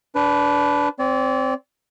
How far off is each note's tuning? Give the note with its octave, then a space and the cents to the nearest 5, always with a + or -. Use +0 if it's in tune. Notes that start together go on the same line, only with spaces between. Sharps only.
D4 -20 B4 +10
C4 +0 D5 -35